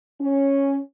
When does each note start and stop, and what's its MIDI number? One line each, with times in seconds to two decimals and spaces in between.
0.21 0.78 61